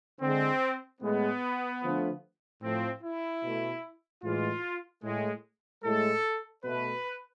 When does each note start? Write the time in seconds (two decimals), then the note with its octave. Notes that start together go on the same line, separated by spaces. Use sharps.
0.21 D3 G#3 C4
1.01 A2 G#3 B3
1.81 D3 F3 A3
2.62 A2 F3 A3 C4
3.02 E4
3.43 B2 A3
4.23 A2 E3 G#3 F4
5.04 A2 G#3
5.83 A2 G#3 A4
6.64 B2 A3 B4